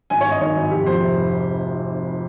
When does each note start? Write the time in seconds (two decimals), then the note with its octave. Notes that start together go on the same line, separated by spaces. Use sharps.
0.10 G#1 G#5
0.21 G2 C#5
0.31 D#5
0.41 D#3 C#5
0.56 G#1
0.71 F1 G4
0.86 F2 C5
1.01 C3
1.17 F1